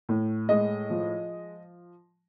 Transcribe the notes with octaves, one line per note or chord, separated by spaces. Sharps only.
A2
G#3 D#5
F3